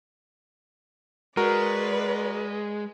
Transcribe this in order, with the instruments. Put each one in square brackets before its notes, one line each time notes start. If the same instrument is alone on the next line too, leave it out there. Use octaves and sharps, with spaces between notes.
[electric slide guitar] G#3 [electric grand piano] F#4 A#4 [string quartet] B4 D5